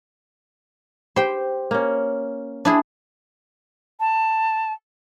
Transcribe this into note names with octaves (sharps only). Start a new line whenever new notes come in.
G4 C5 G5
A#3 C#4
D4 E4 G#4
A5